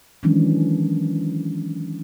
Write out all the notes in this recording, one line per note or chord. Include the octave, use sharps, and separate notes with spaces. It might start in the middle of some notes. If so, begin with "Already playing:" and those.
D#3 E3 F#3 G#3 C#4 D4